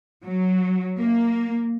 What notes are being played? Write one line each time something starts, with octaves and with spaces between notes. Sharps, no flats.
F#3
A#3